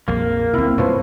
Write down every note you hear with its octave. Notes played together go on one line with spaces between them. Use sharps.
A#1 F2 A#3
D2 B2 C4 E4
F#2 B2 F3 B3 B4 C#5 C6